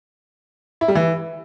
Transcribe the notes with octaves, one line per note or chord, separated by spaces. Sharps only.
E4
G3
E3